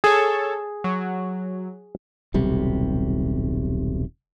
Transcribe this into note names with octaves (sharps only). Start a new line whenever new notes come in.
G#4 A4 C#5
F#3
D#1 B1 C3 G3